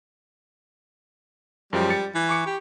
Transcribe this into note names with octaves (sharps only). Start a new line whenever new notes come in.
F#2 F3 G3 G#3
A6 C#7
E3
C#6 D6 C#7
G4